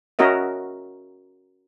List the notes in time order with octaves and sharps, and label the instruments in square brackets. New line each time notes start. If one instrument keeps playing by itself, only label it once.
[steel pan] C#4 F#4 A#4 D#5 E5